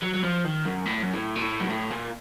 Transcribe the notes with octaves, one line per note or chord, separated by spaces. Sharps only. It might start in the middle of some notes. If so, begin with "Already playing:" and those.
F#3
F#3
F3
D#3
F#2
A2
F#2
A2
A#2
A2
F#2
A2
A#2